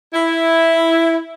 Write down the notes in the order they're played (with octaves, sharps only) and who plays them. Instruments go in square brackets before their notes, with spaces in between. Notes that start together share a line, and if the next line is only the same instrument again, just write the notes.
[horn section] E4